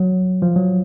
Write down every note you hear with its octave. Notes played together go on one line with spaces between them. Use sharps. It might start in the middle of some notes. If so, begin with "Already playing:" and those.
Already playing: F#3
F3
F#3